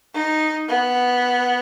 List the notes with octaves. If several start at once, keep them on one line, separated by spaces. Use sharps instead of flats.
D#4
B3